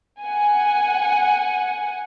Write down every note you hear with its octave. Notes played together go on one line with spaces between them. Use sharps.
F#5 G#5